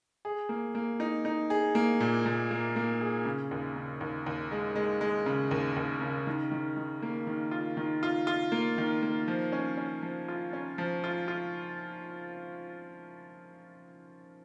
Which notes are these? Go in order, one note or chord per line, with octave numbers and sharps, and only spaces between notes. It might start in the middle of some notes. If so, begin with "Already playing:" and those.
G#4
A#3
A#3
D#4
D#4
G#4
A#3
A#2
A#2
A#3
A#3
G#4
C#3
D#2
C#3
D#2
D#2
G#3
G#3
G#3
C#3
D#2
D#2
C#3
D#3
D#3
D#3
A#3
D#3
F4
D#3
F4
F4
A#3
D#3
A#3
F3
C#4
C#4
F3
F4
C#4
F3
F4
F4